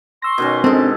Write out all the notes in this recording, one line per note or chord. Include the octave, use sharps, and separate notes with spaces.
C6 C#6 E6 A#6
B2 D#3 C#4
G#3 C4 D4 A4